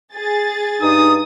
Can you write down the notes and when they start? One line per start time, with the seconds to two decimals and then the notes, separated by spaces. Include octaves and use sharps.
0.15 G#4 A6
0.82 G2 D#4 D#6